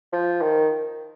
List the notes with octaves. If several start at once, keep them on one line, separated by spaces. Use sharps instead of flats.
F3
D#3